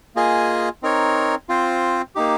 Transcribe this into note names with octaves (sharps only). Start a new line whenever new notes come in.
A#3 F4 G#4 D#5 G#5
C4 D#4 A#4 C#5
C4 F4 C5
A#3 D#4 G4